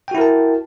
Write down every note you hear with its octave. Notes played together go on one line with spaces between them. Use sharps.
E4 F#4 A#4 G5 A5